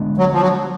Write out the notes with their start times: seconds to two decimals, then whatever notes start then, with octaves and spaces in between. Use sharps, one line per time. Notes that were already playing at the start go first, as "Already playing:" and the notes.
Already playing: D3 G#3 B3 D4
0.18 F#3
0.32 F3
0.41 F#3